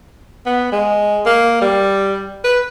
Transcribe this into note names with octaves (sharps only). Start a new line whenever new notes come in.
B3
G#3
A#3
G3
B4